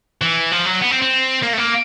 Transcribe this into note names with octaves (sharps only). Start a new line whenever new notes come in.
E3
F3
F#3
B3
C4
C4
A#3
A3
A#3